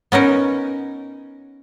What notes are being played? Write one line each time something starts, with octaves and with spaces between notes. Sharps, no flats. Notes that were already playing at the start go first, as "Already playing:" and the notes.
B3 C#4 D#4 A#4